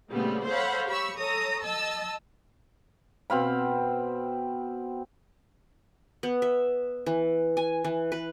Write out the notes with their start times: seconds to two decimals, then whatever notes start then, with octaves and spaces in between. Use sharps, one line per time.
0.10 A#2 C#3 G3 A3 B3 C4
0.47 A4 C5 C#5 F5 F#5 B5
0.87 G4 B5 C#6 E6
1.17 A4 C#5 A#5 D#6
1.63 D#5 A5 E6
3.30 B2 C4 F5 B5
6.23 B3
6.42 E5
7.06 E3
7.57 G#5
7.84 E3
8.12 B4